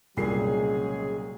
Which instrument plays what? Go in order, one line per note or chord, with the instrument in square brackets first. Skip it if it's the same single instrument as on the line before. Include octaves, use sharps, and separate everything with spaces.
[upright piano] C2 A#2 C7 [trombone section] C#3 F#3 G#3 [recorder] G#4